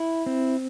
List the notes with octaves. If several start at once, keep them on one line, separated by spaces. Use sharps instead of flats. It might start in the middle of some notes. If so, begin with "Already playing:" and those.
Already playing: E4
C4